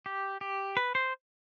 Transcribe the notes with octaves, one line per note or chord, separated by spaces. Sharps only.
G4
G4
B4
C5